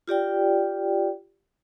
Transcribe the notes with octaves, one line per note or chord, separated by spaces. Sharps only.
F4 G4 D5 G5